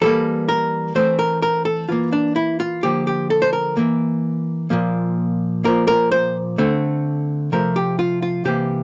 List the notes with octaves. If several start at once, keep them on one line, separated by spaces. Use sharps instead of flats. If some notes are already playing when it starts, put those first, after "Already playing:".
E3 G3 A#3 A4
A#4
E3 A3 C4 C5
A#4
A#4
A4
E3 A#3 F4
D4
E4
F4
D3 F3 A#3 G4
G4
A4
C5
A#4
E3 A#3
A#2 F3 A#3
A#2 F3 A#3 A#4
A#4
C5
D3 A3 C4
C3 F3 A3 A#4
G4
F4
F4
C3 E3 A#3 G4